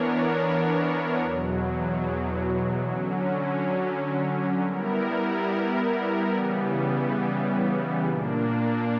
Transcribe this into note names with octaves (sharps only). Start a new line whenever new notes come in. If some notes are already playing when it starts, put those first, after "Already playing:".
Already playing: E3 B3 D4 A#4 C#5
E2 B2 F#3
D3 F#3 C#4
G3 B3 E4 A#4
C#3 E3 G3 B3
A#2 A#3 D4